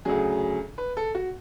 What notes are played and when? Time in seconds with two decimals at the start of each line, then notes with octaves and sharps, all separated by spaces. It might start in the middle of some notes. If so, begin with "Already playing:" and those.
0.05 D2 C#3 F#3 G#4
0.78 B4
0.97 A4
1.15 F#4